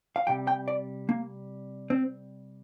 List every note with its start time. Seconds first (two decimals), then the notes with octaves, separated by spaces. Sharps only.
0.16 F5
0.27 C3 G3 G5
0.47 G5
0.68 D5
1.09 A#3
1.90 C4